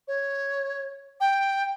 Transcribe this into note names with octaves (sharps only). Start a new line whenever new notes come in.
C#5
G5